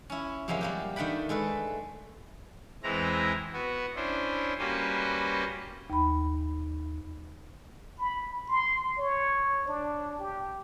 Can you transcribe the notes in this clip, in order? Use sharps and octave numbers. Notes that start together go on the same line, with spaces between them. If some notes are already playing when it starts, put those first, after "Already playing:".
C#4 E4
C3 F3 F#3 G#3 A#3
G3 A#3 G4
D#3 A3 D4 F#5 G5 B5
G#3 A3 A4 B4
E2 E3 G#3 C4 E4 A#5
B3 F#4
C#4 D4 E4 C5
G3 A#3 C#4 F#4 B4 C5
D#2 B5
B5
C6
C#5
D4
G4